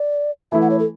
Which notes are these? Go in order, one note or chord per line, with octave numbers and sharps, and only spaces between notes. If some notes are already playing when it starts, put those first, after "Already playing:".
Already playing: D5
E3 A3 E4 E5
F#5
C#5
A4